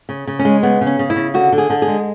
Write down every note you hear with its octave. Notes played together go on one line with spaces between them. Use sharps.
C#3
C#3
C#4
G#3
C#3 B3
C#3
C#4
C#3
E4
C#3
D3 F#4
D3
G#4
D3
G#4
G#3